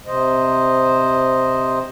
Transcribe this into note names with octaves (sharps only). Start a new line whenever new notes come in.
C3 C5 D#5